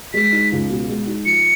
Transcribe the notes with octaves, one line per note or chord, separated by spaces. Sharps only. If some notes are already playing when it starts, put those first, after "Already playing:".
G#3 B6
D#4
C#2
B2
G#3
D#4
F3 C#7